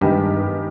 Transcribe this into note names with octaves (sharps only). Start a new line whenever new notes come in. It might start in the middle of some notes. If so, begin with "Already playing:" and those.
G2 D#3 G#3 B3 G4